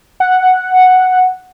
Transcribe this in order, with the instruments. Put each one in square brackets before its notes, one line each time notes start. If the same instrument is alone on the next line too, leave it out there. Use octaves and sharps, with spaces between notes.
[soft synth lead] F#5